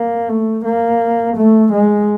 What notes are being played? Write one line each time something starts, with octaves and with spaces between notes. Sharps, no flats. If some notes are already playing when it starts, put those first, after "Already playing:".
Already playing: A#3
A3
A#3
A3
G#3